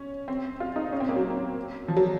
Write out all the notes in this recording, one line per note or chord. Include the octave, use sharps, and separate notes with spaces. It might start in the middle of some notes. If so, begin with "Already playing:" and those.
Already playing: C#4
C4
F4
D#4
C#4
C4
A#3
F#3
F3
F#3